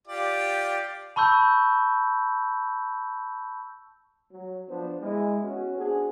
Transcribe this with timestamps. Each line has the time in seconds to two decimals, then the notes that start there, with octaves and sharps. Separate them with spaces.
0.08 F4 G4 D5
1.16 A5 B5 C#6 E6 G6
4.32 F#3
4.69 F3 B3 D4 C5
5.01 G#3 E4
5.42 B3 C#4 F#4
5.77 C4 D4 F#4 G#4